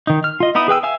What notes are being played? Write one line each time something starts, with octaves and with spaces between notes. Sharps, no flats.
D#3 D#4
F6
F4 D#5
B3 D#4 E4 D#6
G#4 B4 G5 E6
E5 F5 G#5 E6